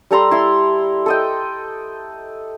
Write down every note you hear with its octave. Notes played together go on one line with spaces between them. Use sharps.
G3 A4 A#5 C6
E4 C6
A4 D#5 G5